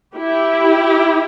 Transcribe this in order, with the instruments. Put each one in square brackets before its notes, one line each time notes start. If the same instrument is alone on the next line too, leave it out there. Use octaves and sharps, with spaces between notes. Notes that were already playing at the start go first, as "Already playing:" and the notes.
[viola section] E4 G4